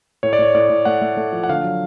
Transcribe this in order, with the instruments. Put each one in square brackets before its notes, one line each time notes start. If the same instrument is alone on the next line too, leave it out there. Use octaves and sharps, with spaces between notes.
[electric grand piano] A2 C#5
D5
A2 C#5
A2 D5
A2
A3 F#5
A3
A3
F3
F#5
D3 F5
F#3